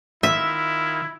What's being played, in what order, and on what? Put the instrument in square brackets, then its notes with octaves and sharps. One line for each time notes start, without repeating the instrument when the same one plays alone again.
[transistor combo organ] D#3 F4 [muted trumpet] E4 [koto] E5